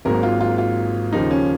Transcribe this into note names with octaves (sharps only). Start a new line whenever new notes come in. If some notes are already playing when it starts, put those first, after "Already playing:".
G#1 G#2 F#3 A#3 A#4
F4
F4
F4
D#2 C#3 F3 A#3 D#4
C#4